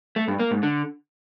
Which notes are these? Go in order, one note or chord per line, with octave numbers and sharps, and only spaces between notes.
A3
G2
A#3
G#2
D3